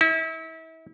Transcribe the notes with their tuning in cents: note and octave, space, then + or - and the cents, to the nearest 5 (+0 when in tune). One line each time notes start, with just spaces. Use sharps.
E4 -35